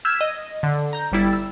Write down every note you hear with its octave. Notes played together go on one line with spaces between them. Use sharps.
E6 F6 G6 G#6 B6 E7
D#5
D3
A#5 G6
G1 G3 E4 A6
E6